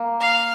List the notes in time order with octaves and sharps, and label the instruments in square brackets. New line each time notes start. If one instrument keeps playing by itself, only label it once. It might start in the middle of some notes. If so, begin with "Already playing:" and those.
Already playing: [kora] A#3
[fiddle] F5